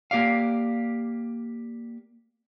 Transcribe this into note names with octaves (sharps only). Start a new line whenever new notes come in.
A#3 G4 D5 F5